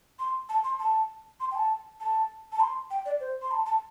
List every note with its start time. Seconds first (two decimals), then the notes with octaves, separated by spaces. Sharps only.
0.19 C6
0.49 A5
0.64 C6
0.79 A5
1.40 C6
1.51 G5
1.55 A5
2.00 A5
2.52 A5
2.60 C6
2.90 G5
3.06 D5
3.20 C5
3.42 C6
3.51 A5
3.66 A5